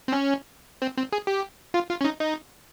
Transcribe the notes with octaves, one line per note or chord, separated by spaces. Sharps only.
C4
C#4
C4
C4
G#4
G4
F4
F4
C#4
D#4
D#4